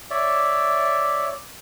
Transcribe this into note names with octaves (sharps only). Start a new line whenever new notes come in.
C#5 D5 E5